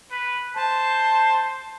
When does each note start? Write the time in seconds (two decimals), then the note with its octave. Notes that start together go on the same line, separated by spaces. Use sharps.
0.11 B4
0.57 C5 A5